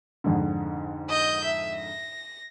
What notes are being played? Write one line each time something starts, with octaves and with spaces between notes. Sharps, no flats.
F2 G#2 D3
D#5 G6
E5
A#6